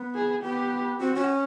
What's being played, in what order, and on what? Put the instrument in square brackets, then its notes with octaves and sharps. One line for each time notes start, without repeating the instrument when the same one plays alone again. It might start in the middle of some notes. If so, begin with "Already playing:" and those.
Already playing: [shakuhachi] B3
[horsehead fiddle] G#4
[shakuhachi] B3 [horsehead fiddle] G4
[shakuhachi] C4 [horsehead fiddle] F#4
[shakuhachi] C#4